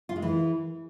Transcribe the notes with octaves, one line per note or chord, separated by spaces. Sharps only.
F4
G#3
E3